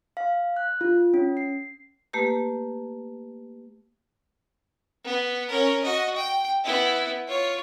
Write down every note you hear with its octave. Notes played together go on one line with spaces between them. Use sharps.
F5
F#6
F4
C#4
C7
A3 A#3 G4 B4
B3
C#4 A#4
F#4 D#5
G5
B3 E4
F4 C#5